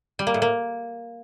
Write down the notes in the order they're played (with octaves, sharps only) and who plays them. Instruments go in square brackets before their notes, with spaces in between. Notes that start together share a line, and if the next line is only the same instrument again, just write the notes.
[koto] G3
A#3
A2
A#3